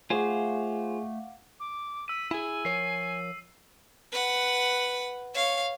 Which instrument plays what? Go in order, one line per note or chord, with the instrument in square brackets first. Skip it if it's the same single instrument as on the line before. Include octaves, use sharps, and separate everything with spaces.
[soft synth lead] A3 [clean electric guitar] F4 C5 [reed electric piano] G#4 G#5 [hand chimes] F5 F#5 D6
[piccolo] D6
[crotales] E6 D#7 [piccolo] B6
[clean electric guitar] E4 G#4 [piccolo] G#5
[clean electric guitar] F3 A#4 C#5 [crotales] C7
[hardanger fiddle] B4 F#5
C#5 F5